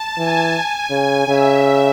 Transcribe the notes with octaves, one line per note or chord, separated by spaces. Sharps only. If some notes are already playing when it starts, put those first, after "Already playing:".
Already playing: A5
E3 G#5
G#5
C#3 G#5
C#3 E5